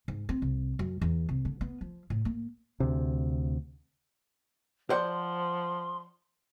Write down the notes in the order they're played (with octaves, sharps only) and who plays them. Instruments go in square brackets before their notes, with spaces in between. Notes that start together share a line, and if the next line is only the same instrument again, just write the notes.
[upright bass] G#2
C4
C2
F#2
E2
C2
D3
B3
F3
A2
A#3
[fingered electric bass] D2 C3
[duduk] F3 [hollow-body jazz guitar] C5 D5 F#5 [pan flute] C6